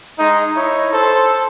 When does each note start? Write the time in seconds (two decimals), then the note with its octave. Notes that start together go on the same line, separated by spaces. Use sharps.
0.19 G#3 D#4
0.56 D#4 E4 C#5
0.93 A4 C5